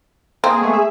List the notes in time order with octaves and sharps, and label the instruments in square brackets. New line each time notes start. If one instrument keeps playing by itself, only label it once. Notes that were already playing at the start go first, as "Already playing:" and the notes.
[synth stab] A#3 [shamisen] C4 [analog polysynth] G#4
[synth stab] G#3 A3 B3
E5